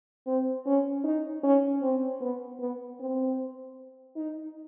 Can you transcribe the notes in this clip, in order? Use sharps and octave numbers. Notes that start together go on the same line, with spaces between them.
C4
C#4
D#4
C#4
C4
B3
B3
C4
D#4